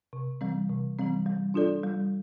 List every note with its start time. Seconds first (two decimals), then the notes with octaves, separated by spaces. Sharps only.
0.13 C3
0.41 E3 G3 C4
0.69 C3
0.98 E3 G3 C4
1.26 G3
1.54 D4 F4 A4 D5
1.83 G3